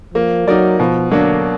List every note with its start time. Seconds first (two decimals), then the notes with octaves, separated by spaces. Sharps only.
0.14 F3 A#3
0.47 F#3 D#4 A#4 D5
0.79 B2 F3
1.11 D3 F#3 A#3 D4